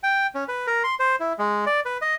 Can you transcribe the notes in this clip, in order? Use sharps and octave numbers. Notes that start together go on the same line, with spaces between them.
G5
C#4
B4
A#4
C6
C5
E4
G#3
D5
B4
D#5